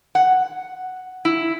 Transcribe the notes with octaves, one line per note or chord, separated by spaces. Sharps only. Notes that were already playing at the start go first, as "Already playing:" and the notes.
F#5
E4